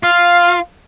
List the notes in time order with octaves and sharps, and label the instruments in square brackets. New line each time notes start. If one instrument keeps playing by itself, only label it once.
[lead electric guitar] F4 [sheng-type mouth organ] F5